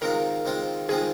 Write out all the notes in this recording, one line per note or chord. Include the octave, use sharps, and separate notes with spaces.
D#3 G#3 C4 F4 A#4
D#3 G#3 C4 F4
D#3 G#3 C4 F4 G#4